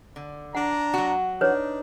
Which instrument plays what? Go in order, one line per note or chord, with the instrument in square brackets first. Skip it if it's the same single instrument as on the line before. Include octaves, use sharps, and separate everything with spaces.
[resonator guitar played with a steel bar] D3
[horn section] D4 A#5 [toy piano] F#5
[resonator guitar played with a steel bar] F#3 F#4
[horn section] D4 D#4 [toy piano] B4 C#5